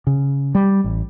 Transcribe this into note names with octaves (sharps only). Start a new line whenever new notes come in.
C#3
G3
A1